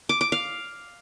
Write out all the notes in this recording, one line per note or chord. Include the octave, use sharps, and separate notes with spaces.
D6
D6
F5